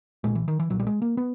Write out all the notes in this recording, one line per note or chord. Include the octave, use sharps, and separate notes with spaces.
B1 A#2 G#3
E3
D#3
E3
B1 A#2 F#3
G3
G#3
A#3
B3